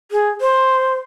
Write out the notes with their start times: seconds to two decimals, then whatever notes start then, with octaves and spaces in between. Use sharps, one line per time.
0.12 G#4
0.41 C5